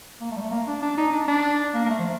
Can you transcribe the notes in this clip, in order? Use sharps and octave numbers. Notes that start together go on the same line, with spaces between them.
A#3
A3
G3
A3
A#3
D4
D4
D#4
D4
D4
A#3
A#3
A3
F3